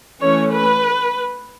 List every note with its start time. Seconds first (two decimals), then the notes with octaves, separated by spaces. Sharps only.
0.21 E3 A3 C#4 C#5
0.52 B4